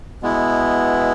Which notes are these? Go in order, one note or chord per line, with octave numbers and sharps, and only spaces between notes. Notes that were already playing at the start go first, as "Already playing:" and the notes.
B2 G#3 B3 E4